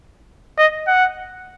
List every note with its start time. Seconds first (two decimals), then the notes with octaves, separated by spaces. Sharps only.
0.58 D#5
0.87 F#5